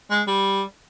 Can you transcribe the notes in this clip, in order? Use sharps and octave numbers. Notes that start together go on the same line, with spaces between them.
G#3
G3